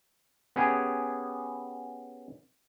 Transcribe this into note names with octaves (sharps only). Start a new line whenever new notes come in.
B3 C#4 G4 G#4